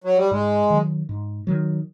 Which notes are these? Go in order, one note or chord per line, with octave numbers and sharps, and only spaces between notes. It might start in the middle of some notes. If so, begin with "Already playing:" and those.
F#3
G3
G#2 G#3
D#3 F#3
G#2
D#3 F#3